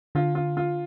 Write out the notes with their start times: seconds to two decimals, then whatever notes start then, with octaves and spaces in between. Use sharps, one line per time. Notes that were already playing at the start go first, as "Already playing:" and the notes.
0.15 D3 F4
0.35 F4
0.57 F4